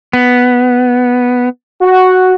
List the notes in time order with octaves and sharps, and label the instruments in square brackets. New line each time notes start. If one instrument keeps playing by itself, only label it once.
[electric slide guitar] B3
[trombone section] F#4